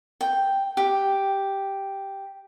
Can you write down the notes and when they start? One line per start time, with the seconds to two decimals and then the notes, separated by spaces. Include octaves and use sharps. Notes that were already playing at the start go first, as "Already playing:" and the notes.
0.21 G5
0.77 G4